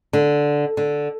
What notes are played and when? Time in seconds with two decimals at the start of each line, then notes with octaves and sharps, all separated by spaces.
0.13 D3
0.77 D3